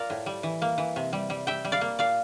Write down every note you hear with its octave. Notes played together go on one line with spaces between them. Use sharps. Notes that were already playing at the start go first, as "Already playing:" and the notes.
Already playing: F4 A#4 D5
A2
G3
E3
A#3
E3
C3
G3
G3
G3 E5 G5
G3
D5 F5
A#3
A#2 D5 F5